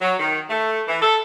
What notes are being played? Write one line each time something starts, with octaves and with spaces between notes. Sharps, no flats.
F#3
D#3
A3
E3
A4